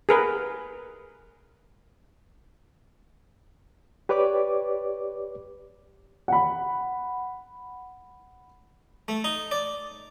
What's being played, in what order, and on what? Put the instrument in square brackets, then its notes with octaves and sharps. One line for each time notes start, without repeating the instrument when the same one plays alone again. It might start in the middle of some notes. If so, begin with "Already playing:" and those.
[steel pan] G#4 A#4 B4
[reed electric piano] G4 B4 C#5 D5 D6
[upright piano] F#5 B5
[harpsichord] A3
D#4
D5